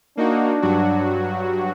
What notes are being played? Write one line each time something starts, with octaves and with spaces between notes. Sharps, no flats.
A#3 D4 D#4 F#4
G2 F#3 F#4